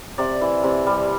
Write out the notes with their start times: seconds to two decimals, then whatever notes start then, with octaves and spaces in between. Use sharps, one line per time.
0.18 C3 D5
0.41 E3
0.64 C3
0.87 G3